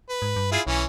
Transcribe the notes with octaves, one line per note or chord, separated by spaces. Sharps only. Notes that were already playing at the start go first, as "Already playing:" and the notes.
B4
G#2
G2
E4 F4 G#4
B1 E3 C#4